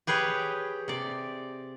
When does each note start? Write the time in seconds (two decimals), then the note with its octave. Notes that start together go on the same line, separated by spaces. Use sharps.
0.07 G4 G#4 B4 C#5 G5
0.88 C3 D5